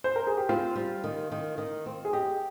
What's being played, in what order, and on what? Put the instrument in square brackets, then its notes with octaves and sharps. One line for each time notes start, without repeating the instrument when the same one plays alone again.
[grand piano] C5
A#4
G#4
G4
[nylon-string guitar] C4 [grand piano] F4
[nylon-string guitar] G3
D#3
D#3
D#3
C4
[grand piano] G#4
[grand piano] G4 [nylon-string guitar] D#5